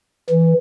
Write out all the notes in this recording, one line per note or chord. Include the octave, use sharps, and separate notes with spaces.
E3